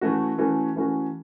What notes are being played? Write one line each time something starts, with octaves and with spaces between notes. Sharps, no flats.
E3 A3 C#4 F#4
E3 A3 C#4 F#4
E3 A3 C#4 F#4